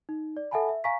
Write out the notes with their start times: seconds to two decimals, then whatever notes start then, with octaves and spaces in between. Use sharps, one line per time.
0.09 D#4
0.37 D5
0.51 A4 E5 F#5 G#5 A5 B5
0.69 E5
0.84 F5 G#5 A#5 C#6 B6